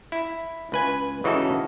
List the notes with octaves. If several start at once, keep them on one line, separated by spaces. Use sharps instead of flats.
E4
C#2 B4 G#5
C#3 E3 D#4 F#4 A4